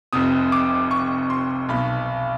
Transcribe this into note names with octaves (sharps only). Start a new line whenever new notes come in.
F1 F2 C3 D#6
D6
C#6
C6
B1 B2 B5